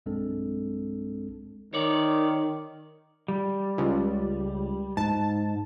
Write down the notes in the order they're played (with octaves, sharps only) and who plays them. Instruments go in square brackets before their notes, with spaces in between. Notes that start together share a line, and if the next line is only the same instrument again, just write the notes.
[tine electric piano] B1 G2 G#3 C4 D4 A4
[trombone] D#3 [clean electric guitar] C#5 D5
[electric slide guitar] G3
[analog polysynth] C#2
[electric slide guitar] G#2 [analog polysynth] A5